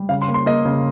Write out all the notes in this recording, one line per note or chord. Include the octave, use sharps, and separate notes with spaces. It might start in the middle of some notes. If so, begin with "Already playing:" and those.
Already playing: G3
C#3 F5
C6
A#3
C6
A#3 D#5
C#3